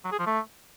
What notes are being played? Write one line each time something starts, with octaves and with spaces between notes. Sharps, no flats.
F#3
G#4
F3
A3